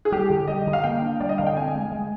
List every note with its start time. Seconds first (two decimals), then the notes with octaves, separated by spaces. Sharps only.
0.05 G#4
0.12 G3 G4
0.30 D3
0.48 G3 D#5
0.67 D3
0.73 F5
0.84 A#3 G5
1.02 D4
1.20 G3 D5
1.29 D#5
1.38 D3 F5
1.47 G5
1.57 C4 G#5
1.75 G#3
1.92 G#3